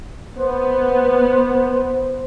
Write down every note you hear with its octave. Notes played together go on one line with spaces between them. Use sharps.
B3 C5